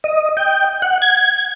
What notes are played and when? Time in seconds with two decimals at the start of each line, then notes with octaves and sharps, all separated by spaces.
0.04 D#5
0.37 G5
0.82 F#5
1.02 G#6
1.17 G#6